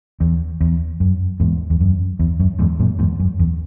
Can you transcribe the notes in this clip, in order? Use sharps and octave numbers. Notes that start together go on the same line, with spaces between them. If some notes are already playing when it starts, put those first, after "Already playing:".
E2
E2
F#2
E2 G#2
E2
F#2
E2
F#2
E2 G#2
F#2 A#2
E2 G#2
F#2
E2